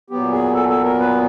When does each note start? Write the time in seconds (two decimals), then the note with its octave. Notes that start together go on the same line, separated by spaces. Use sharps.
0.10 A#2 F#3 B3 G4
0.32 G#4
0.54 A4
0.69 A4
0.84 A#4
0.99 B4